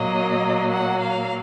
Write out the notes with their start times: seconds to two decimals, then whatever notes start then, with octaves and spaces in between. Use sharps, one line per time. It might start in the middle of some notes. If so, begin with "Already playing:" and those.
Already playing: A#2 F#3 A#3 D#5
0.71 F#5
1.01 F5